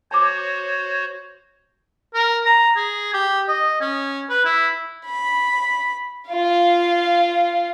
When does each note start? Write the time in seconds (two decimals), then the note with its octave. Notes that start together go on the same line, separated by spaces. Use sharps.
0.11 F#4 C5 C#5 A5 D6
2.14 A#4
2.46 A#5
2.76 G#4
3.14 G4
3.48 D#5
3.81 C#4
4.30 B4
4.45 E4
5.06 B5
6.30 F4 F5